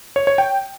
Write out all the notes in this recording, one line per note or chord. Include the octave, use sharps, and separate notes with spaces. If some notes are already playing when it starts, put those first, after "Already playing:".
C#5
C#5
G5